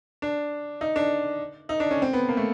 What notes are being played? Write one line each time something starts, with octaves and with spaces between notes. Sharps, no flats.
D4
D#4
D4
D#4
D4
C#4
C4
B3
A#3
A3